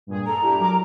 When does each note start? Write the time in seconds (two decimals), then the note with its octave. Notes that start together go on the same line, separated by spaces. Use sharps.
0.07 G2 A#2 G#4
0.27 A4 A#5
0.40 D4 E4 G4
0.59 F#3 A#4 D6